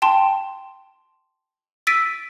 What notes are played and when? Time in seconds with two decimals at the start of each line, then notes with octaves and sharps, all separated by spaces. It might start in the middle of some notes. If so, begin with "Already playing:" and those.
0.02 G5 A5 C6
1.87 E6 A6 B6 D7 D#7